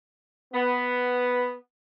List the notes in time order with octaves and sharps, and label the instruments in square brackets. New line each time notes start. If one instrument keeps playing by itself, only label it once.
[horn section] B3